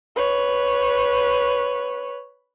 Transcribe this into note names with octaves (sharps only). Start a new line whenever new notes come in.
B4 C#5